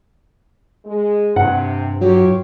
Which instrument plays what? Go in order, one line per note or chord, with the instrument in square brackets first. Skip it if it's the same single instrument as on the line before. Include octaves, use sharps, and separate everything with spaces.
[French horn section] G#3
[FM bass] G2 [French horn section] C3 [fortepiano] F#5
[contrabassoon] F#3 [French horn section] F4 G4 C#5